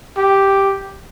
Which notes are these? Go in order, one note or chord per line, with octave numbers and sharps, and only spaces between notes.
G4